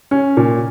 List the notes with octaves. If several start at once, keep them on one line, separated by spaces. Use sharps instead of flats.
C#4
A#2